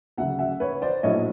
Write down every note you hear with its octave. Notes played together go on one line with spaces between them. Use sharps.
D2 C#3 F#3 E5 F#5
E5 F#5
B4 C#5
C5 D5
A#1 A2 F#3 A3 D4 C#5 D#5